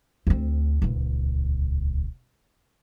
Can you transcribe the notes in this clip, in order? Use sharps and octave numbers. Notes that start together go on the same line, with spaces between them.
D2 C4
D#1 C#2